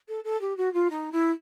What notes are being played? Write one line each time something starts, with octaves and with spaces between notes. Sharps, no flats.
A4
A4
G4
F#4
F4
D#4
E4